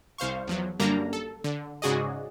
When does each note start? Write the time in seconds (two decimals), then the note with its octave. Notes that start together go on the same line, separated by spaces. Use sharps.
0.18 C2 C5 F5 C#6
0.47 E2 F3 F#3
0.79 F#2 D3 G3 A#3 D4 A#5
1.13 A4
1.44 D3
1.82 G#2 C#3 F#4 G#4 D5 D#5